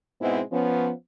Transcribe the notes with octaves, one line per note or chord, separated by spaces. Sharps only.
G#2 B2 G#3 B3 C4 E4
F3 B3 C#4